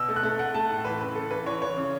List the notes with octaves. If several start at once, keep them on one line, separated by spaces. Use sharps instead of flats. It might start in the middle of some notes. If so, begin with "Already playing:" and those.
Already playing: B2 E6
A3
F#6
A3
A3 F#5
A3 A5
A2
E3 B4
C#3 B4
C#3 A4
E3 B4
E3 C#5
E3 C#5
C#3